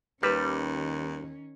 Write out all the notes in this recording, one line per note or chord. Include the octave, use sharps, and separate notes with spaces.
D#2 D#3 G3 C#4 B4